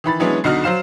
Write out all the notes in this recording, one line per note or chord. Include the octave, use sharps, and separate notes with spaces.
D#3 E3 B5 A6
E3 F#3 G#3 B3 C#4 D4
B1 D3 D#4 F#4 F6
F#3 C5 F5 E7